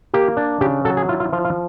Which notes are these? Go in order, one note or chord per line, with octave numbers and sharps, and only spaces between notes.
A#3 G4
D4
C#3 G4
F#3 A4
G#4
E4 F4
F4
F3 F4
F4